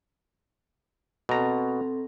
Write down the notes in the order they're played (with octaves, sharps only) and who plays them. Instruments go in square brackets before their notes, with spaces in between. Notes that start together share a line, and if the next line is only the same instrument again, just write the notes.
[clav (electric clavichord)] B2 A#5 [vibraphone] C4 A4